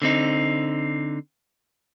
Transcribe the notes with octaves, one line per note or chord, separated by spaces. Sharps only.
D3 C4 D#4